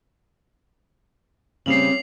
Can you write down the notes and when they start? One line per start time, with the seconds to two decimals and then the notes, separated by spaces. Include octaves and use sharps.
1.66 C#3 G3 C4 C7 F7 F#7